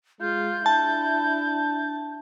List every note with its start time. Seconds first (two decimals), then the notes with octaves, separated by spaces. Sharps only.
0.21 G#3 F4 G6
0.66 D4 E4 A5